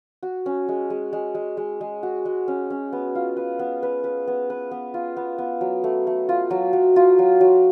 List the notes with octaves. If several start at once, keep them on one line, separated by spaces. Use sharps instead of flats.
F#4
C#4
G#3
G#3
G#3
G#3
G#3
G#3
F#4
G#3
C#4
C#4
B3
F4
B4
B3
B4
B4
B3
B4
B3
F4
B3
B3
F#3
A3
A3
F4
F#3
F#3
F4
F#3
F#3